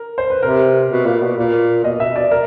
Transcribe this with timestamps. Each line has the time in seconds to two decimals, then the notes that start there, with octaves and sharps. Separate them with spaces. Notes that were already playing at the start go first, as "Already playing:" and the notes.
Already playing: A#4
0.18 C5
0.30 B4
0.43 C3 A#4
0.90 B2
1.06 A#2
1.22 B2
1.38 A#2
1.84 B2 D#5
2.00 B2 E5
2.16 B2 D5
2.31 A#4